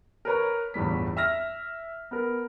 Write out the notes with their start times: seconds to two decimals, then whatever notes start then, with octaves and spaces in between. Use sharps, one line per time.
0.25 A#4 B4 C#5 A#5
0.74 G1 E2 A2 G3 B6
1.17 E5 F6 A#6
2.11 B3 A#4